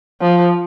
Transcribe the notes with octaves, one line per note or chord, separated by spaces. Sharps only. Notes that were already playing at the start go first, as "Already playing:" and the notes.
F3